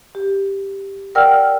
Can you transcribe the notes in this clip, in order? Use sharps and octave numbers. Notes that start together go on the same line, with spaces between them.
G4
A#4 D5 F#5 G5 E6 F6